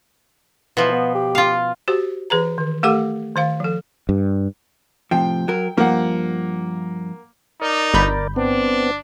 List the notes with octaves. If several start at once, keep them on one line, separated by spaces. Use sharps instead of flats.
B2 E3 F3
B3
G4
F4 F5
F#4 G4 C5
E3 G#4 B4 A#5
D#3
A3 G4 A4 A#4 F#5 D6
D#3 C5 F5
F3 A4
G2
A2 C3 F3 G5
F#3 A#4
G2 F3 A#3 F#5
D#4 A#4 D5
G1 B5 G6
B3 C4 D4